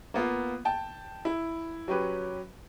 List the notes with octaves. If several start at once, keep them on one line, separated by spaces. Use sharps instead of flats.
A#3 B3 F4
G5 A5
E4
F#3 C#4 G4 B4